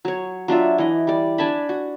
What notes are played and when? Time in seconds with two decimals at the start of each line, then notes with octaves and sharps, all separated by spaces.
0.05 F#3 C#5
0.48 F#3 D4 F4 E5
0.78 E3 D#5
1.07 G3 D5
1.38 D4 G#5 A5 B5
1.69 F#4